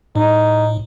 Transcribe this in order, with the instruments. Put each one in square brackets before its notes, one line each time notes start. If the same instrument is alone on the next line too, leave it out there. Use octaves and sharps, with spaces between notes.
[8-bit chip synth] A2 [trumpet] D#4